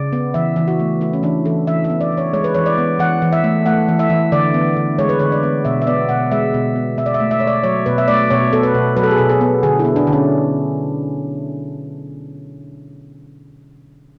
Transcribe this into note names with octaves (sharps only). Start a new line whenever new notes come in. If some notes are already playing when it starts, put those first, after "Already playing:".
Already playing: C#3 D5
B3
E3 E5
E3
F#4
A3
A3 E4
C#4
E3 D4
E3 A4
E3 E5
E5
B3
D5
E3
C#5
G#3 C#5
B4
E3 C#5
D5
B3
E3 F#5
E3
E5
A3
A3 F#5
E3
E5
E3
D3 D5
B3
D3
G#3 C#5
B4
D3 C#5
D5
B3
B2 E5
E5
B3 D5
B2 F#5
G#3 E5
B2
B3
B2 E5
D5
E5
A3
E5
B2 C#5
D5
F#3 C#5
B2 B4
E5
A3 D5
B2 C#5
B3 A4
B4
B2
F#3 B4
A4
G#4
B2 A4
G#4
B3
D3 G#4
E4
B3
D4
D3
C#4